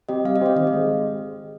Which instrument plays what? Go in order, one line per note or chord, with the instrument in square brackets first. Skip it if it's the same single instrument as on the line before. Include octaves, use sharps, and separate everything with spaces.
[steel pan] C4 G4 C5 [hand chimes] D#5
[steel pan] G3 [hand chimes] F5
[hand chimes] D#5
[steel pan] C4 G4 C5 [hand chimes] F5
[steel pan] D#3 [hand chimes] D#5
[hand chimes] D#5
[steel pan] G#3